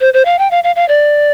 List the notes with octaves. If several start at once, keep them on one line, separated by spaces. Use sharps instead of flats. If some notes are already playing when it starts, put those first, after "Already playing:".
C5
C5
F5
G5
F5
F5
F5
D5